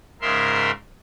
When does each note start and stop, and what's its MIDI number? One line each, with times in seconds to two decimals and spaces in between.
0.21 0.71 44
0.21 0.71 49
0.21 0.71 70
0.21 0.71 76
0.21 0.71 84